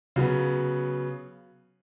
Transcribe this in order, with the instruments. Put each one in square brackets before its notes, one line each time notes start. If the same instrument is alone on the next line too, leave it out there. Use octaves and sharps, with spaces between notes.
[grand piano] C#3 F#3 B3